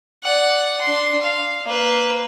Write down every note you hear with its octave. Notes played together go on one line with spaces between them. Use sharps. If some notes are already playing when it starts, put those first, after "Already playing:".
D5 F#5
D4 C6
F5
A#3 B4